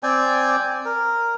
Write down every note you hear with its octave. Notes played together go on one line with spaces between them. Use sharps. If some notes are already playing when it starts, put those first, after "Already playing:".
C4 D5 G5 G#5
A#4